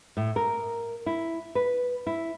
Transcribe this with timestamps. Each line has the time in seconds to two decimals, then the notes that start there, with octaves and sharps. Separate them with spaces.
0.17 A2
0.36 A#4
1.06 E4
1.55 B4
2.07 E4